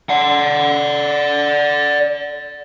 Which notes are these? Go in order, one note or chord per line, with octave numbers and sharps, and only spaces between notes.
D5 F#5